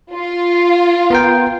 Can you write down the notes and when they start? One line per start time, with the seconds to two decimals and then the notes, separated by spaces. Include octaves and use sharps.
0.12 F4
1.10 B3 A#4 G5